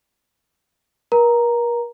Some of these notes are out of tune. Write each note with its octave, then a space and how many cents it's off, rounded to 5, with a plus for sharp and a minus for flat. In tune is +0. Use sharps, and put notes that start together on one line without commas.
A#4 +40 A#5 +0